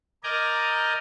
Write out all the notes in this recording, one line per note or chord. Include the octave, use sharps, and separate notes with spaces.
A#4 D5 D#5 G#5 A#5 G6